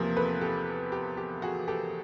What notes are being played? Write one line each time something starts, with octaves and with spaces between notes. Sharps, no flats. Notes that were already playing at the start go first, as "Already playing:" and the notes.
Already playing: E2 C3 F3 A#3
A4 B4
G4 A4
G4
G4
F#4 G#4
G4 A4